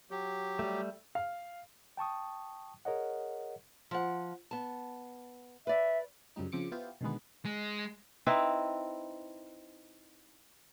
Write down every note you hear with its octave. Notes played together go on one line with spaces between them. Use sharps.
F#3 G4
G3 A3
F5
G5 A5 C#6 D#6
G#4 A#4 C#5 D#5 F#5
F3 F#5
B3 A5
B4 D5 E5
F#2 C#3 F3 G3 D#4
C#3 F3 C4 D6 C#7
B3 E4 F4 G4 C5
B2 D3 D#3 G#3 B3
G#3
C4 D#4 E4 B4